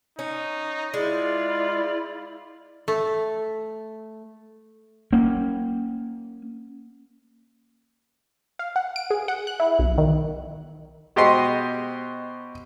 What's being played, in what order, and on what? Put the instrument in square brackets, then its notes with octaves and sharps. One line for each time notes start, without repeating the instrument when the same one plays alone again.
[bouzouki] C#4 [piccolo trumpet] D#4
[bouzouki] G#3 [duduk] E4 [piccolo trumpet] F4 [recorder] D5
[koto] A3
[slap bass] A#3 C#4
[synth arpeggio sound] F5
F#5
D7
G#4
F#5
F#6
E4
B1
D#3
[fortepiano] B2 G4 C5 D#5 C6